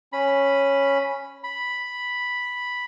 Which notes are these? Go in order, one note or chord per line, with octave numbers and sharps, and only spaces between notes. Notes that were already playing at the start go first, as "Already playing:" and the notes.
C#4 B5
B5